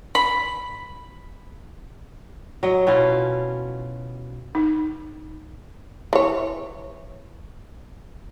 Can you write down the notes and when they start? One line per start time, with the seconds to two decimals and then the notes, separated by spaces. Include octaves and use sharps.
0.15 B5
2.63 F#3 D#5
2.87 B2 C#4 E4 F4
4.55 D#4
6.13 E3 C#5